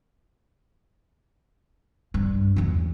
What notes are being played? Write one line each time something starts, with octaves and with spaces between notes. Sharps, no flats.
G2
E2 C#3